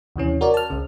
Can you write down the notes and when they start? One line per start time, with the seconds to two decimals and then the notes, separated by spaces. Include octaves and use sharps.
0.16 D#2 C3 E3 C#4
0.41 F#4 A#4 C#5 D5
0.54 A5 F6
0.70 C#2 C#3